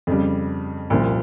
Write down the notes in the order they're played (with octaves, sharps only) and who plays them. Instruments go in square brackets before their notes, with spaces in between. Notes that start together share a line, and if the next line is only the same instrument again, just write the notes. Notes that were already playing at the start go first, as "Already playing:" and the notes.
[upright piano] F2 C#3 G3
C2 A#2 F3